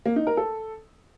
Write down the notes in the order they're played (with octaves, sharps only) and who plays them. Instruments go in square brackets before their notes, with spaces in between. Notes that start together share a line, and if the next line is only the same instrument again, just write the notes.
[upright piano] A#3
D#4
A#4
A4